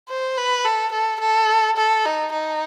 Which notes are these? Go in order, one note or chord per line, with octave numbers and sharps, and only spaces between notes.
C5
B4
A4
A4
A4
A4
D#4
D#4